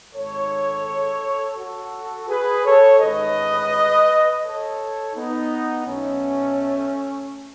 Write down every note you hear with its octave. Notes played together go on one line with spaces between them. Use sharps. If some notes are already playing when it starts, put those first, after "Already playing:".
G#1 G#2 D#3 A4 C#5
F#4 A4
G#4 B4
A4 C#5
A1 G#2 D#3 B4 D#5
A4 C#5
B3 D#4
B1 B2 A3 C#4